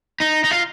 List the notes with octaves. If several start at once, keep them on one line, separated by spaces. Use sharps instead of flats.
D#4
D#4
F4